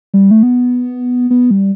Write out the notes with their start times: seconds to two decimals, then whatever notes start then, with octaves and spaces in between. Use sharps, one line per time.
0.14 G3
0.31 A3
0.43 B3
1.30 B3
1.51 G3